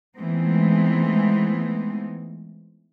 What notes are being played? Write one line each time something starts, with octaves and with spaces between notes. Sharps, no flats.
E3 G#3 A3 B3 C4 D#4